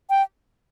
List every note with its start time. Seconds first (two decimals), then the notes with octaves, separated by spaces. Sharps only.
0.10 G5